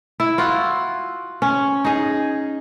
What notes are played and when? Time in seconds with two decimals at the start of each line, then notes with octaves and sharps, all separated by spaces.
0.20 E4
0.38 F4 F#4 F#5
1.42 C#4
1.85 D#4 G#4